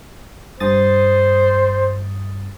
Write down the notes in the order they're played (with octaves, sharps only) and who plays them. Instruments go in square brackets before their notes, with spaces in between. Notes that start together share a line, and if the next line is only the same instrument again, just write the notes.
[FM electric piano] G2 D#6 A6 [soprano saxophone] C5